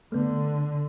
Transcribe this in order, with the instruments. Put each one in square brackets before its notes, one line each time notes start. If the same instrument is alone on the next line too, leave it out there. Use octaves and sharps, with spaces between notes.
[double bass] D3 [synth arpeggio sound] A3 B3